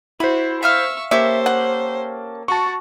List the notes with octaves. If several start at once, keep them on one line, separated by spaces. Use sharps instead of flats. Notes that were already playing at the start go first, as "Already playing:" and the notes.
E4 F#4 C5 B5
E5 F5 C#6 E6 F6
A#3 C#4 G4 A4 C5 E5
F#5
F#4 A5 C#6